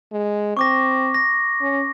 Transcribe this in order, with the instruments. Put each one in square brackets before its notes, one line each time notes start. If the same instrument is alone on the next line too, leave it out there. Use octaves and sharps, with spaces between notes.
[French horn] G#3
[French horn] C4 [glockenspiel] C#6 D6 A#6
[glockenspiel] A#6
[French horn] C#4